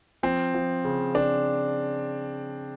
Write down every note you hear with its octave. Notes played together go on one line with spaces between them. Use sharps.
F3 C4
F3
C#3
C#3 D4